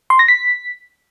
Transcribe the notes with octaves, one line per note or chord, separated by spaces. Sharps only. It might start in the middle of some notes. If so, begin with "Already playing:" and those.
C6
A#6
B6